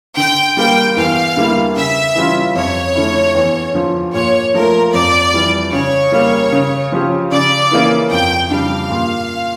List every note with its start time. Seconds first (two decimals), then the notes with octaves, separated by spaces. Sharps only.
0.17 D3 G5
0.57 G3 A#3 G5
0.96 E2 F5
1.37 D3 G3 A#3 E4
1.76 C#3 E5
2.15 E3 G3 C#4 F4
2.55 F2 C#5
2.95 D3 A3 C#4 E4
3.35 E2
3.74 D3 F3
4.14 A#2 C#5
4.54 F3 A3 A#4
4.93 F2 D5
5.34 E3 G3
5.73 C#3 C#5
6.12 G3 A#3
6.52 C#3
6.92 F3 C#4 G4
7.32 C#3 D5
7.71 E3 A#3 C#4
8.11 F2 G5
8.51 C#3 G3 D4 F5
8.90 A#2